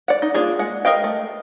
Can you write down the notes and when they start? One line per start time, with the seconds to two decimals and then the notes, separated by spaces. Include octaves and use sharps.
0.08 D5 F#5
0.22 D#4
0.34 A#3 D4 F4 G#4
0.59 G#3 F#5
0.85 A#4 D#5 F5 G5
1.04 A3